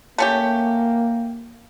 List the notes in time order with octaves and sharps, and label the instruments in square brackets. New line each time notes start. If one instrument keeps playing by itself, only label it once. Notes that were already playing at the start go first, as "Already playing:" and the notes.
[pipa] A3 C#4 G4 [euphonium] A#3